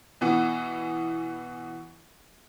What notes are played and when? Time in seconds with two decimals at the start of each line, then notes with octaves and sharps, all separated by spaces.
0.21 B2 E3 B3